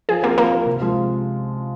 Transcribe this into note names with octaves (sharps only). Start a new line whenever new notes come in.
F3 G#4
A#3 C4 G4 A#4
F3 A#3
C4 G4 A#4
C3
F3 G#3